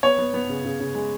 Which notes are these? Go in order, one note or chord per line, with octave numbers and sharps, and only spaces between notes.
B3 C#5
B3
B3
C#3
C#3
C#3
G#3